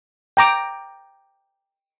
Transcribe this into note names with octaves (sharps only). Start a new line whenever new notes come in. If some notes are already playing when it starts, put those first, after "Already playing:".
G5 A#5 D6